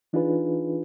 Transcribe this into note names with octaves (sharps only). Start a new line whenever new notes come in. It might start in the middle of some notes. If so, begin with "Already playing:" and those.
E3 D4 D#4 F4 G#4 B4